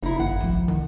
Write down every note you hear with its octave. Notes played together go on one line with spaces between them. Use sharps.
F#1 D#4 E4
G#1 F#2 F#5
C2 F3
C2 D#3